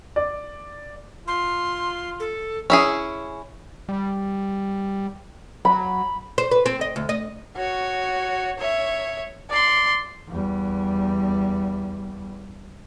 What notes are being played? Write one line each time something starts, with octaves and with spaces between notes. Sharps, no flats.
D5
F4 C6
A4
C#4 E4 G#4
G3
F#3 B5
C5
B4
C4
D#5
D2
D#5
F#4 C#5
C#5 E5
D5 C6
E2 G3